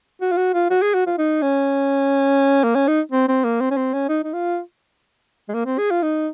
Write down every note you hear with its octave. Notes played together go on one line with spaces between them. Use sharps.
F#4
F4
F#4
F4
F#4
G#4
F#4
F4
D#4
C#4
A#3
C#4
D#4
C4
C4
A#3
C4
C#4
C4
C#4
D#4
D#4
F4
G#3
A#3
C4
G#4
F4
D#4